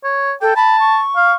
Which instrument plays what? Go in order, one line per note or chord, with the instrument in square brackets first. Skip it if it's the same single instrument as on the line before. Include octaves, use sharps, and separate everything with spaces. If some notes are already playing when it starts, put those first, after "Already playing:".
[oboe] C#5
[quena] A4 [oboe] G5
[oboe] A5 [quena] B5
[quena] C#6
[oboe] F5